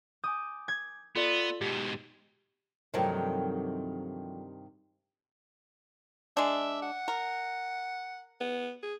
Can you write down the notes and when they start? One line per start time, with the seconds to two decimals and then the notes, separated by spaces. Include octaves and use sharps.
0.24 G#5 D6 D#6 G6
0.68 G#6
1.16 B3 F4 A4 D5
1.61 G#2 B2 G4
2.94 G2 C3 D#3 F3 F#3 A3
6.37 G#3 D4 E5
6.82 F#5
7.08 A#4
8.41 B3
8.83 G#4